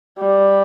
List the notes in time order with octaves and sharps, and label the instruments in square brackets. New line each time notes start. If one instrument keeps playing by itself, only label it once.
[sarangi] G3